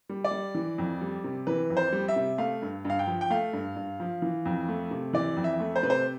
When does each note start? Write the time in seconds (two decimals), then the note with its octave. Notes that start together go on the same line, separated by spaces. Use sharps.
0.09 G3
0.24 D5
0.31 G3
0.55 E3
0.78 F2
1.01 G3
1.24 C3
1.47 E3 B4
1.70 F2
1.77 C5
1.92 G3
2.08 E5
2.16 C3
2.38 A3 F5
2.62 G2
2.85 G2
2.90 F5
2.99 G5
3.07 F3
3.21 G5
3.30 A3 F5
3.53 G2
3.76 G2
4.00 F3
4.22 E3
4.46 F2
4.68 A3
4.91 C3
5.13 E3 D5
5.36 F2
5.44 E5
5.60 A3
5.76 C5
5.83 C3 B4
5.90 C5